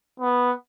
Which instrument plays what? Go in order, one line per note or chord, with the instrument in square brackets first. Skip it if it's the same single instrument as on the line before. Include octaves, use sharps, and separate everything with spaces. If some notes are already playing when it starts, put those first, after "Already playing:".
[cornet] B3